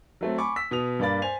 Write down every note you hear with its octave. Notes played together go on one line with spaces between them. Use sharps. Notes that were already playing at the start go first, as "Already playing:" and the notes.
F#3 A3 C4
G#5 B5 C#6 D6
E6 B6
B2 D#6 F7
G2 A#3 D5 B5 A6
C5 G#5 F7